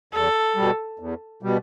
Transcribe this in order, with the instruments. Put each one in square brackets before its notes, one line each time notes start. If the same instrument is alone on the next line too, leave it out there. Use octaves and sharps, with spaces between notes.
[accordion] E2 [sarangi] A4
[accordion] B2 G3
E2
B2 G3